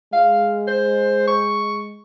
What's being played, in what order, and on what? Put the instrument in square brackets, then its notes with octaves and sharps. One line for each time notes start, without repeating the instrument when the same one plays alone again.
[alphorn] G#3 [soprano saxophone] F5
[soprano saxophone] C5
C#6